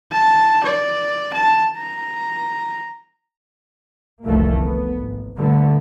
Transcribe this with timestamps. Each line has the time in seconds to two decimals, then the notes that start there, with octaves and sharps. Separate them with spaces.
0.12 A5
0.63 D5
1.34 A5
1.78 A#5
4.23 F1 C2 D3 E3 A3 A#3
4.62 B3
4.98 G#1
5.37 A#2 D3 G3 A3 B3